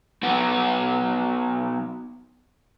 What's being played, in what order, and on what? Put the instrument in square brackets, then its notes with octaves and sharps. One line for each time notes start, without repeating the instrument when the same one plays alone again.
[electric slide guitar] B3 D#4 F#4 B4 F#5